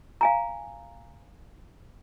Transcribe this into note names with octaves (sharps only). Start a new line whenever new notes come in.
F5 G#5 A#5